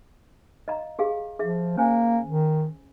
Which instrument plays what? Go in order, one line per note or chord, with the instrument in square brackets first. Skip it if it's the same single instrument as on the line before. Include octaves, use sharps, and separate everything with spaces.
[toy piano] D#5 F5 A#5
G4 G#4 F5
[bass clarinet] F3 [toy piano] G#4 E5
[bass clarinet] A#3 [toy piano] C#4 C5 G#5
[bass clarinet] D#3